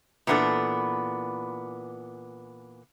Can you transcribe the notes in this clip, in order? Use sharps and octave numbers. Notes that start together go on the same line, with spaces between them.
A#2 E3 B3 D4 A4